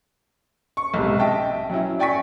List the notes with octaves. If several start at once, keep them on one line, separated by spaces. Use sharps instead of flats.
C#6
B1 G#2 C3
D#5 E5 G5 A5
F#3 C#4 E4
D5 G5 G#5 C#6 B6